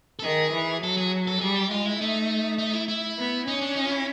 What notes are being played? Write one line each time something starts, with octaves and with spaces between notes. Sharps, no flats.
A4
D#3 G#4
E3
F#3 A4
G#4
A4
G3 G#4
G4
G#3 F4
E4
A3 D#4
D#4
E4
E4
B3
C#4 D#4
D4
D#4
F4
E4